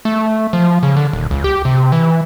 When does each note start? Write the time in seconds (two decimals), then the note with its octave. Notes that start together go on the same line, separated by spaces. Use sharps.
0.05 A3
0.53 F3
0.83 C#3
0.96 D3
1.13 D#1
1.31 C#2
1.44 G4
1.65 C3
1.92 E3